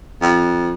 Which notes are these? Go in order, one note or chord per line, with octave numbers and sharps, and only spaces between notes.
F2